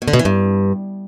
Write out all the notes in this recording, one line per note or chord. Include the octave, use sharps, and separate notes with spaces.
B2
D3
B2
E3
G2